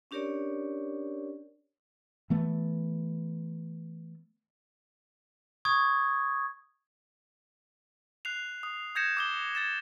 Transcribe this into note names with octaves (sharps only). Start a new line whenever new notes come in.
C#4 D4 G4 A#4 C#5 D5
E3 A3 B3
C#6 D#6 G#6
F#6 C7 F7
D#6
D#6 G6 G#6 A#6 C#7 E7
D6 D#6 G7
G#6 A6 E7